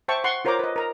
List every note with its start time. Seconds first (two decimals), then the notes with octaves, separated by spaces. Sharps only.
0.08 C5 E5 G5 A5 C#6
0.24 F#5 C6 C#6
0.45 F4 A#4 C5 C#5 A#5 D6
0.59 B4 D#5
0.76 A#4 A#5